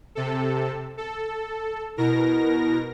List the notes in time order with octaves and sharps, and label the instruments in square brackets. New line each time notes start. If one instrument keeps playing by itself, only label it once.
[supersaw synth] C3 A4
A4
[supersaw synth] B2 A#4 A#6 [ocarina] E4